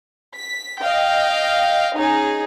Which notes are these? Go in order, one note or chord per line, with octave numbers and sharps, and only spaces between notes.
B6
D#5 F5 G5
C#4 D#4 G#4